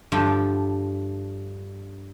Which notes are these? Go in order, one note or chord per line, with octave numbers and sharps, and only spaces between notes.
G2 D3 F3 D4 G4 G5